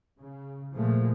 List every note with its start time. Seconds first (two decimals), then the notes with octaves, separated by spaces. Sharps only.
0.19 C#3
0.75 A#2 F3 G#3 A3